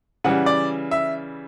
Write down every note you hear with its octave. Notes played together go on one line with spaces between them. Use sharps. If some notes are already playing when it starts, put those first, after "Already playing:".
C#3 E3 G3 F#5
D5
E5